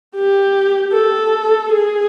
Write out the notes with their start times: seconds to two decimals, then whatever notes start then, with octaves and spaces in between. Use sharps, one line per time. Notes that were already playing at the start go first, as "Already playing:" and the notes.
0.15 G4
0.92 A4
1.72 G#4